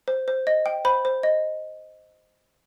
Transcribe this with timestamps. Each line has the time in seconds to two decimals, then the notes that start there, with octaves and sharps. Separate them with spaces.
0.08 C5
0.28 C5
0.47 D#5
0.66 G5
0.85 C5 B5
1.05 C5
1.23 D#5